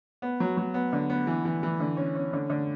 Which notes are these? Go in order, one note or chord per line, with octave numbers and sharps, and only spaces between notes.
B3
F#3
F#3
B3
D3
B3
E3
E3
E3
D3
C#4
C#4
D3
D3